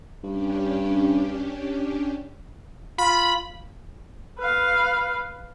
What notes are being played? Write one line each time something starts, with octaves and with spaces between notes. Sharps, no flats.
G2 C#4 D4 G4
F4 B5
B4 F5